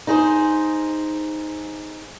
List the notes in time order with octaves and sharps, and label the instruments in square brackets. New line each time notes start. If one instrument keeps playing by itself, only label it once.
[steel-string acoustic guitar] D#4 G#4 C5